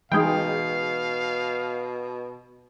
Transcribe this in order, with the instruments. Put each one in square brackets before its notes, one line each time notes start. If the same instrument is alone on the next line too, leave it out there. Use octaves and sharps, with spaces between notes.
[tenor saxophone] B2 [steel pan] E3 G#3 D#4 [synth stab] G#4 G5 [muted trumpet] F5